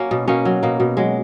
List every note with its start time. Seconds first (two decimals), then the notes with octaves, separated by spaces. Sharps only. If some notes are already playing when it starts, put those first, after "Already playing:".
Already playing: F#3 A#3 C#4
0.11 B2
0.28 B2 A#3 C#4
0.45 F#3
0.63 B2 A#3
0.80 B2
0.97 F#3 G#3